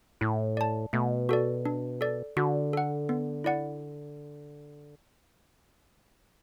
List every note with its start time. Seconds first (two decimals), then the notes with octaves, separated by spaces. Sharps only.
0.21 A2 E4
0.57 D5 A5
0.93 B2 A3
1.29 F#4 A4 D5
1.65 D4
2.01 A4 D5
2.37 D3 F#4
2.73 A4 F#5
3.09 B3
3.44 E4 D5 F#5